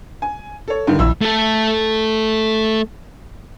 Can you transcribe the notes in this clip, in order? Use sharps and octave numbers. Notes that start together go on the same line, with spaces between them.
G#5
A4 C#5
G2 D3 D#3
A#1 F2 E4 E6
A3 A4